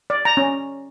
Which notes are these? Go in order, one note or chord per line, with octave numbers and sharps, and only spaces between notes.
D5
A#5
C#4